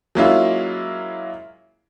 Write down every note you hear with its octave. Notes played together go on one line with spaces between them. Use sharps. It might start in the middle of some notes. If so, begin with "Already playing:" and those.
F#3 G#3 A#3 C#4 E4 F4